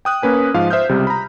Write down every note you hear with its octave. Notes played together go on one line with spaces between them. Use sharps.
G5 D#6 F#6
A#3 C#4 B4 G#5
G#2 F3 F5
C5 E5 D#6 F6 G6
C#2 C3 G3
A#5 B5